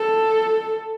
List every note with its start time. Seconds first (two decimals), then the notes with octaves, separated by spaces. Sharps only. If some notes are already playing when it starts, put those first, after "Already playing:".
Already playing: A4